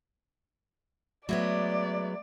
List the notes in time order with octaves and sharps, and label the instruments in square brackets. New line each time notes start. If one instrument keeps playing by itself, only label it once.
[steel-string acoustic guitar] F#3 G#3 B3 [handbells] A3 E5 G#6 [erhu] D5